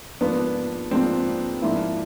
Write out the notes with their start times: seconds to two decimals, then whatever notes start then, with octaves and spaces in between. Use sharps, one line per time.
0.21 G#2 F3 A#3 B3 D4 F4
0.91 G#2 F3 A#3 C4 D4 F4
1.62 G#2 F3 A#3 D4 E4 F4